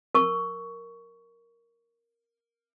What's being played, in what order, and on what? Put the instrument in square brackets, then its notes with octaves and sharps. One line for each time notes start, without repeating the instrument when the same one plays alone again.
[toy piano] A#4 C#6